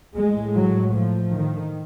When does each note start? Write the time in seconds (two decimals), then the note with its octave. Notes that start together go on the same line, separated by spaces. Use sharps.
0.14 A2 G#3
0.54 F#3
0.93 F3
1.34 D#3